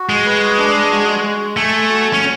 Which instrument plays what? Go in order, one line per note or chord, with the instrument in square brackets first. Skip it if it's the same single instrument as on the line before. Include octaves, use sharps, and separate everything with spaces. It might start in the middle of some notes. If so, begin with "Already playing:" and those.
Already playing: [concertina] F#4
[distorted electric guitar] G#3
[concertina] B4
D4
F#4
G#3
[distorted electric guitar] A3 [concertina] G#5
[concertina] F#4
[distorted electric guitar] C#4